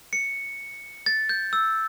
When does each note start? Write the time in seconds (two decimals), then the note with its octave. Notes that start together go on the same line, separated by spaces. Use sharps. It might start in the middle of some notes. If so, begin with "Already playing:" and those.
0.13 C#7
1.06 A6
1.29 G6
1.53 E6